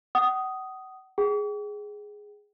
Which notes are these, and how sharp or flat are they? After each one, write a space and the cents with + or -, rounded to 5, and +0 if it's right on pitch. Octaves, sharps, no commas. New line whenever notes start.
F#5 +35 D#6 +0
G#4 +0 G5 -25